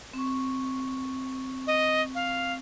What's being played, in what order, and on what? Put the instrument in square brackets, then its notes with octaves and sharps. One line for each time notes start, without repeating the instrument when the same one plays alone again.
[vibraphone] C4 C#6
[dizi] D#5
F5